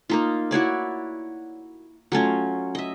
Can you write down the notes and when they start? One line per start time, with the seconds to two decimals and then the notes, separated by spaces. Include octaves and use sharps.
0.10 A#3 D#4 F4
0.51 E4 F#4 C#5 D5
2.12 F#3 A3 C#4 F4
2.75 D#5 E5